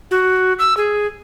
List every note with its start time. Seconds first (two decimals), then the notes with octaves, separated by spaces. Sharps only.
0.11 F#4
0.59 E6
0.77 G#4